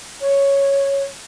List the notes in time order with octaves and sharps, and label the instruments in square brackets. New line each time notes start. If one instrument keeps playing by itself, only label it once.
[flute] C#5